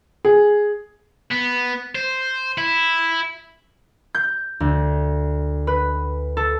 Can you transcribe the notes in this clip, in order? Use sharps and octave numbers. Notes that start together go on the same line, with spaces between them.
G#4
B3
C5
E4
G6
D2
B4
A4